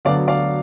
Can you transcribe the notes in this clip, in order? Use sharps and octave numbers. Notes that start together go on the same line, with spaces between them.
D2 D3 F#3 B3 D5 F5
D5 F5